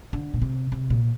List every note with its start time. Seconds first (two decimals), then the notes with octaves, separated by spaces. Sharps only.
0.13 D3
0.34 A#2
0.42 C3
0.72 C3
0.90 A#2